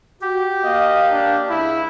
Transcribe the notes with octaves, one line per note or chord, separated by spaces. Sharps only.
F#4 G4
A#3 D#5 F5
D4
C#2 E4